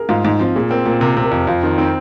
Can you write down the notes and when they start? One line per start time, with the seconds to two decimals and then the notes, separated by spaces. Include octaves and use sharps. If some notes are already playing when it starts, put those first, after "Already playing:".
Already playing: G#4 A#4
0.09 G#2 F4
0.25 G#2 D#4
0.39 F3 C4
0.55 A#2 G#4
0.71 C4 A#4
0.85 A#2 A#4
1.01 C3 A#4
1.17 C3
1.24 A#4
1.31 F2
1.47 F2 F4
1.63 D#3 C4
1.78 C4 D#4